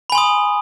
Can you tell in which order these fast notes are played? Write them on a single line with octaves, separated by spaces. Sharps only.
B5 G#5 C6 D#6